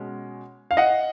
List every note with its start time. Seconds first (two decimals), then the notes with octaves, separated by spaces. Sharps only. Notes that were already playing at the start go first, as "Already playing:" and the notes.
Already playing: B2 G#3 C#4
0.71 F5
0.77 D#5 F#5